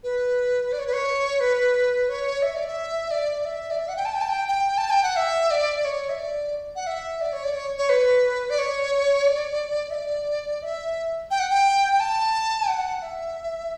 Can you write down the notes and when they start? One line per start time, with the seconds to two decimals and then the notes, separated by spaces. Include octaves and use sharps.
0.03 B4
0.73 D5
0.79 C#5
0.87 B4
0.93 C#5
1.40 B4
2.09 C#5
2.42 E5
2.55 D5
2.67 E5
3.11 D5
3.45 E5
3.71 D5
3.79 E5
3.89 F#5
3.97 G5
4.05 A5
4.14 G5
4.21 A5
4.29 G5
4.48 G5
4.78 A5
4.90 G5
5.03 F#5
5.16 E5
5.51 D5
5.85 C#5
6.09 E5
6.19 D5
6.76 F#5
6.87 E5
7.21 D5
7.33 C#5
7.44 D5
7.55 C#5
7.78 C#5
7.89 B4
8.50 D5
8.59 C#5
9.27 D5
9.90 E5
9.94 D5
10.63 E5
11.31 G5
11.40 F#5
11.50 G5
11.93 G5
12.00 A5
12.69 F#5
13.02 E5